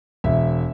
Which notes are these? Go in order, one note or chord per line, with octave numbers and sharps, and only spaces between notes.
E1 E5